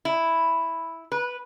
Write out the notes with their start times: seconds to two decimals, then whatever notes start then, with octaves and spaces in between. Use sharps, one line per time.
0.05 E4
1.12 B4